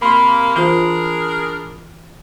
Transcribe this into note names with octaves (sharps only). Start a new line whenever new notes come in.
C3 A#3 B5 C6
E3 D4 F4 G#4 A#4 C5